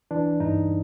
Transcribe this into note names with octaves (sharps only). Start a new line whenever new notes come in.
E3 D4
G2 D#4